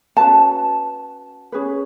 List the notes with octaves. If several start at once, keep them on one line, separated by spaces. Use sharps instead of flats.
C#4 F#4 B4 A5
C#4 G#4 B4